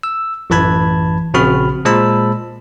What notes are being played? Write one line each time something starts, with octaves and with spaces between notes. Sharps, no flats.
E6
A1 F#2 E3 A5 B5 G#6
A#1 C#3 C4 F#4 B5 F6
A#2 G#3 C5 A5 B5 E6